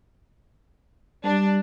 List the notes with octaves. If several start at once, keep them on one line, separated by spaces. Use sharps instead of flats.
G3 D4